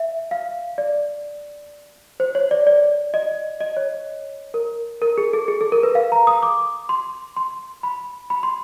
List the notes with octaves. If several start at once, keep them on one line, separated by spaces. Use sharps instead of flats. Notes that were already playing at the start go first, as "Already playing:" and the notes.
Already playing: E5
F5
D5
C5
C#5
D5
D5
D#5
D#5
C#5
A#4
A#4
G#4
A4
G#4
A4
A#4
B4
F5
A#5
D#6
D6
C6
C6
B5
B5
C6